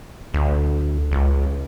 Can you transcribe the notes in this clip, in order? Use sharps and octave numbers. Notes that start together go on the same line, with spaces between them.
D2
C#2